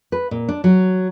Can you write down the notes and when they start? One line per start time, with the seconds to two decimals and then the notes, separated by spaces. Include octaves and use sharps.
0.12 B4
0.31 A#2
0.49 D4
0.64 F#3